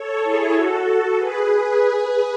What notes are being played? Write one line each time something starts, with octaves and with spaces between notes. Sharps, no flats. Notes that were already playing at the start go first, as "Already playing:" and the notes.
Already playing: A4 C#5
E4 G#4
F#4 A4
F#4 A4
G#4 B4